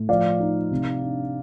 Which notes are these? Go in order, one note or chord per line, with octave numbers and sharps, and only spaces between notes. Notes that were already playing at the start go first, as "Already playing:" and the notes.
Already playing: A2
F3 D5 F5
D#4
C3
D4